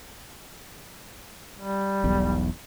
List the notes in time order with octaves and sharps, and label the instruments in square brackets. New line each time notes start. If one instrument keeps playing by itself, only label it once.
[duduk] G3
[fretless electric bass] E1 B1 E2